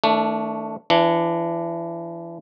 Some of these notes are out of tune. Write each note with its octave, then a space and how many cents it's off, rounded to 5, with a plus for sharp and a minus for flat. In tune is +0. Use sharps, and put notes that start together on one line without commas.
D#3 +40 A3 +10 D4 -15
E3 +30 D4 +0